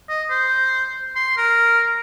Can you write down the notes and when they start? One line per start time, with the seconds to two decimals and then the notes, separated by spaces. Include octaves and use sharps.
0.09 D#5
0.30 C5
1.16 C6
1.37 A#4